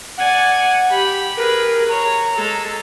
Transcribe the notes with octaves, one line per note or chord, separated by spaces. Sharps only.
D5 F#5 G#5
G4 B5
G#4 A#4 B4
C#5 A#5
G#3 A4